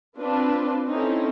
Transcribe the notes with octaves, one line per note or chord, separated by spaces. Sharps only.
C4 D4 F4 B4
C4 C#4 D#4 E4 A4